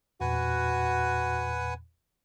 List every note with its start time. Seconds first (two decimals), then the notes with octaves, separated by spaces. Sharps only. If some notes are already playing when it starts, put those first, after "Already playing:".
0.21 E2 A#2 F#4 B4 F#5 G#5